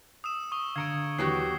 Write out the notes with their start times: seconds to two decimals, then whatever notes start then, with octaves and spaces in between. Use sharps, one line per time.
0.24 D#6 E6 E7
0.52 C#6 D#6 G7
0.76 D3 F5 A#5 D#6 G#6 C#7 D7
1.18 D#2 E3 F#3 F#4 G4 C7